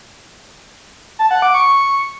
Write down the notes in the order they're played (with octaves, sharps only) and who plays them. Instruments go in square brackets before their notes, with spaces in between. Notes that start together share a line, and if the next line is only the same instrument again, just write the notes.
[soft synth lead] A5
F#5
D6
C#6
C#6